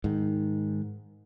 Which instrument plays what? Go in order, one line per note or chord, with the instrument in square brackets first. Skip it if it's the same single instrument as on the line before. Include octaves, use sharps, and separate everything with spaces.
[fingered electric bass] G#2 D#3